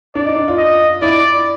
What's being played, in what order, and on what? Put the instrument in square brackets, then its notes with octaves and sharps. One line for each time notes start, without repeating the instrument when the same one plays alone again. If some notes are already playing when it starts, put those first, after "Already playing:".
[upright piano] D4 [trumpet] D5
[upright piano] D#4
D4
F4
[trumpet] D#5
[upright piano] E4 [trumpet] D5